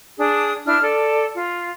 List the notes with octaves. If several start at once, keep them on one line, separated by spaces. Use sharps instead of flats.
D4 G#4 D#6
D4 E4 F6
A4 D5
F4